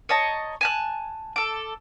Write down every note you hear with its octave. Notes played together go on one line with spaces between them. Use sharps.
C#5 D#5 A5 A#5
G#5 A5 F#6
A4 D6